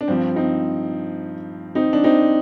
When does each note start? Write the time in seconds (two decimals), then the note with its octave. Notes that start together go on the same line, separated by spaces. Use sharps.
0.01 D4
0.08 G2 F3 C4
0.36 C4 D#4
1.75 C4 D#4
1.93 D4
2.04 C4 D#4